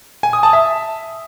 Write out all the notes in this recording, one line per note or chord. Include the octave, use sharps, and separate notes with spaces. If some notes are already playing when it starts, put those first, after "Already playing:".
G#5
D#6
A5
E5